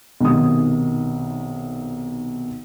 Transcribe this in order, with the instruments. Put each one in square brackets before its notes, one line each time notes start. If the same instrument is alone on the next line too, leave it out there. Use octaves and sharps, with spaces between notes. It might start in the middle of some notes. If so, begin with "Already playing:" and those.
[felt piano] B1 C3 D#3 D#6